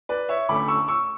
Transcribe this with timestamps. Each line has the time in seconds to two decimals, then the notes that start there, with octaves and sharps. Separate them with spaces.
0.09 B4 D5
0.29 C#5 E5
0.49 D2 D3 A3 C#4 B5 D6
0.68 C#6 E6
0.88 C#6 E6